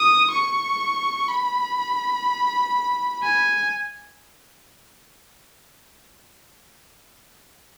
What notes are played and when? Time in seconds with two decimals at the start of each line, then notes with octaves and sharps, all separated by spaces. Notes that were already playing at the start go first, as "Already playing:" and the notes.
Already playing: D#6
0.31 C#6
1.28 B5
3.22 G#5